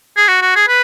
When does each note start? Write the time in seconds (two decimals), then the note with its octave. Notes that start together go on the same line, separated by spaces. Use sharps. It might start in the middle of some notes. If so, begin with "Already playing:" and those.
0.17 G#4
0.28 F#4
0.42 F#4
0.56 G#4
0.68 B4